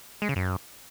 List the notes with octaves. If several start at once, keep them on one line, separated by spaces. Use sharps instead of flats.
G#3
C#3
F#2